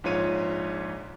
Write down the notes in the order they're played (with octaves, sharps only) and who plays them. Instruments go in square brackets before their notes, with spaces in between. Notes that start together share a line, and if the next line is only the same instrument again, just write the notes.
[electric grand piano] A#1 G#2 F4 C#5 D#7